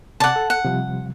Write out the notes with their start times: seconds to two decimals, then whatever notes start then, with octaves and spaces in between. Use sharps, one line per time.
0.20 C3 D5 F#5 A5 D6
0.36 A4
0.50 F#5
0.65 C3 F3 G3